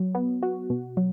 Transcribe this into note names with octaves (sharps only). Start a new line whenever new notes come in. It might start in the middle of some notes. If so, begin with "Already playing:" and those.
Already playing: F#3
B3
F#4
B2
F#3